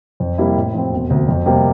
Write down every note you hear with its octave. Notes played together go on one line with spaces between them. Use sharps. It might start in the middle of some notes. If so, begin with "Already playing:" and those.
F2
C3 G3 A#3 E4
A2
F3 C4
E1
D2 C3
F2
C3 G3 A#3